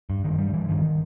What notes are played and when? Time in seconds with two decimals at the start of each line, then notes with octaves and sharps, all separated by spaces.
0.10 G2
0.24 G2 D#3
0.39 G2 G3
0.50 G3
0.54 G2 E3
0.69 G2 D#3